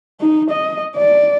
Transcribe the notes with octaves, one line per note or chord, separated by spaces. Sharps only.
D#4
D#5
D5